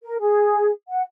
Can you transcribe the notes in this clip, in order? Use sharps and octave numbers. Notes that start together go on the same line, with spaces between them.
A#4
G#4
F#5